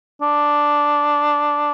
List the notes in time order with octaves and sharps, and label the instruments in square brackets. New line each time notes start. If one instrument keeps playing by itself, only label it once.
[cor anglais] D4